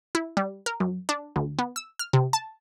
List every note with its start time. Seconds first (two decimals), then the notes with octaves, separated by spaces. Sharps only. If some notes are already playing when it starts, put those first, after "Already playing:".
0.15 E4
0.37 G3
0.66 A#4
0.80 F#2
1.09 D4
1.36 D2
1.59 B3
1.76 E6
1.99 F6
2.13 C3
2.33 A5